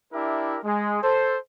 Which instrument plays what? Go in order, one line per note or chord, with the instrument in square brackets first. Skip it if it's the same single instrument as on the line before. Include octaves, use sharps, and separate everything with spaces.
[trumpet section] D4 E4 G4 A#4 E5
G#3
A4 C5